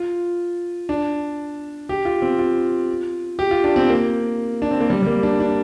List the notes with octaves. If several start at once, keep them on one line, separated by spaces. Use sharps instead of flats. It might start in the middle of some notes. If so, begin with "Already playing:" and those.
Already playing: F4
D4
G4
F4
C4
F4
G4
F4
D4
C4
A#3
D4
C4
A#3
G3
G3
A#3
D4
D4